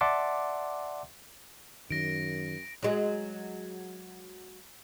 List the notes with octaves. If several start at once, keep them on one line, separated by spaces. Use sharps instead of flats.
D5 E5 F#5 A5 C6 D6
F#2 D#3 A#6 D7
F#3 G#3